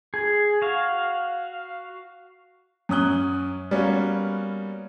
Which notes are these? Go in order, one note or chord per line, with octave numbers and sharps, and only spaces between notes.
G#4
F#4 F5
F#2 C#4 D#6 F#6 G7
G3 A#3 B3 C#4 F#4